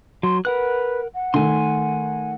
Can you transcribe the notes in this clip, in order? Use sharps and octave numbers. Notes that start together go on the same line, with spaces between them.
F#3 C6
A#4 B4 F#5 F#6
F#5
D#3 A3 G#5 C6